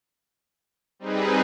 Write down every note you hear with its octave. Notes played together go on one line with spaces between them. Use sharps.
G3 C4 D#4 G#4 B4